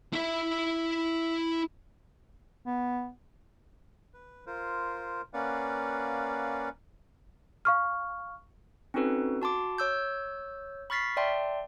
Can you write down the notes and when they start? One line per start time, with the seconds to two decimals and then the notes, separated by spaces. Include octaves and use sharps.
0.13 E4 E5
2.66 B3
4.14 B4
4.47 F4 A#4 C5
5.34 A#3 C#4 B4 D5 F5 F#5
7.65 F5 C#6 F6
8.94 C4 C#4 D#4 F#4 A4 B4
9.42 F#4 A5 C6 D6
9.78 C#5 E6 G6
10.90 B5 C#6 F6 A6 B6 C7
11.17 D5 E5 G5 A5 C6